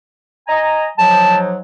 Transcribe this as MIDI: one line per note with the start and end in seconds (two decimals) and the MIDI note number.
0.48 0.86 75
0.48 0.86 80
0.48 0.86 82
0.98 1.59 44
0.98 1.59 53
0.98 1.59 54
0.98 1.37 81